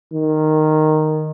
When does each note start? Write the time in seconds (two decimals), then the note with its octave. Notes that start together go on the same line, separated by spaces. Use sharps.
0.13 D#3